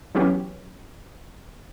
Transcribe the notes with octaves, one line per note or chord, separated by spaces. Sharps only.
E3 F#3 B3 C#4 G4